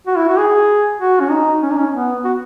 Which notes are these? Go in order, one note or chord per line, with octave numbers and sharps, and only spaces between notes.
F#4
E4
F#4
G#4
F#4
C#4
D#4
C#4
D#4
C#4
B3
F#4